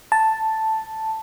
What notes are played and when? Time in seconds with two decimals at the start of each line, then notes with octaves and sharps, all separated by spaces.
0.12 A5